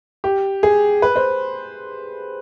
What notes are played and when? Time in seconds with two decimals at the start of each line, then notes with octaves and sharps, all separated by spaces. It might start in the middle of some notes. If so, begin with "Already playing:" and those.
0.24 G4
0.63 G#4
1.02 B4
1.16 C5